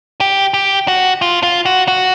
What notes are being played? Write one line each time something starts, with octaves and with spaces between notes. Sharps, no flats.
G4
G4
F#4
F4
F4
F#4
F#4